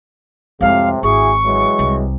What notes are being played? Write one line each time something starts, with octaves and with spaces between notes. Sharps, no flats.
F2 A2 C3 G#3 F5
G#1 E4 F#4 G#4 C#6
E3 F#3 G#3
C2